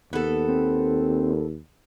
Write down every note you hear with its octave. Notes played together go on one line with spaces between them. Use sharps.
D#2 B3 A4
C4